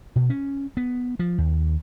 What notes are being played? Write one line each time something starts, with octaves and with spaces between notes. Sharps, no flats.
B2
C#4
B3
F3
D#2